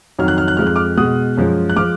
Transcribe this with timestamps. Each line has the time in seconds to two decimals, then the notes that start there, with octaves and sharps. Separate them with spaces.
0.19 F2 D#3 F#3 F6
0.28 F#6
0.38 F6
0.48 F#6
0.57 F2 F3 G#3 F6
0.67 F#6
0.76 D6 F6
0.97 B2 G#3 D#6 F#6
1.37 F#2 F3 G#3
1.70 F#6
1.76 F3 G#3 D6 F6